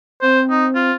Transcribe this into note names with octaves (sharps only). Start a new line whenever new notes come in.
C4 C5
D#4
F4